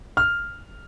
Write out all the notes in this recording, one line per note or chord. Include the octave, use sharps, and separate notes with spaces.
F6